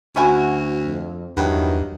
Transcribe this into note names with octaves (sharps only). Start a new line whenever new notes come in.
D2 C#4 E4 F#4 G#5
F2
E2 G2 D#3 E3 F#3 F#4 G5